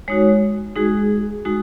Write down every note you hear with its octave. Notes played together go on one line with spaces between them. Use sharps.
G#3 D#4 F#4 C#5
G#3 D#4 F#4 G#4
G#3 D#4 F#4